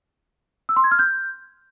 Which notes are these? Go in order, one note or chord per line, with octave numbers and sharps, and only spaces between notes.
E6
C6
G#6
F6
G6